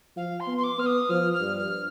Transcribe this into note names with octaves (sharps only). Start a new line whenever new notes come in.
F3 F5
C6
B3
C6
D6
B3 F6
D#6
F3 F6
F6
G2
F6